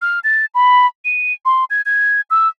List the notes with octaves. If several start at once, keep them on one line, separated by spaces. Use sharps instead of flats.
F6
A6
B5
D#7
C6
G#6
G#6
E6